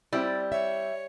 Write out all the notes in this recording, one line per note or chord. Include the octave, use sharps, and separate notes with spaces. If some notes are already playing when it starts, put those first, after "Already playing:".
G3 C4 E4 D5
C#5 E5